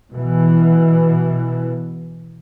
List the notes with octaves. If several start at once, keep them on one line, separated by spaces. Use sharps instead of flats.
B2 E3